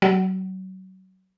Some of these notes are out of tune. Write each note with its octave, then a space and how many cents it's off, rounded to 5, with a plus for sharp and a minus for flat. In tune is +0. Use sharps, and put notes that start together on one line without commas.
F#3 +30